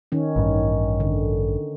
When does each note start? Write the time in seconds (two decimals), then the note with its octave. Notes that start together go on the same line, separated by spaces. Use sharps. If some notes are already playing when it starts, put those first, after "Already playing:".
0.12 D#3 C#4
0.36 A1 G2
1.00 D3